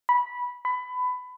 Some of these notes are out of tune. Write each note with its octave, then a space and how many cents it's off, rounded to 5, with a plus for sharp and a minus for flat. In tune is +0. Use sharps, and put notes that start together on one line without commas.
B5 -15
B5 +20